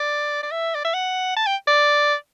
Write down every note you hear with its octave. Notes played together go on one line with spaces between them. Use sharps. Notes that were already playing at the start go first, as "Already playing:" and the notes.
Already playing: D5
D5
E5
D5
E5
F#5
A5
G5
D5